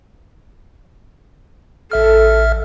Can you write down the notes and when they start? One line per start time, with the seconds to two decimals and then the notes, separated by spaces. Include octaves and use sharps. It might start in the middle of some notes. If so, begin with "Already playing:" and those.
1.91 A1 A4 E5 F6